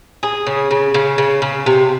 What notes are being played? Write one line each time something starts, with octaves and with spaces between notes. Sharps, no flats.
G#4
C#3
C#3
C#3
C#3
C#3
C3